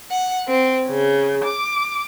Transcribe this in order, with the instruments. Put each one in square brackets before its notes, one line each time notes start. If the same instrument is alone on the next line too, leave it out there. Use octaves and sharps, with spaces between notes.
[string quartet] F#5
C4
C#3
D6